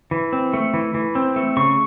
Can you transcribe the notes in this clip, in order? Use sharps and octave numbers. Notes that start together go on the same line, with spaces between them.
E3
C4
A3
E3
E3
C4
A3
C#3 C#6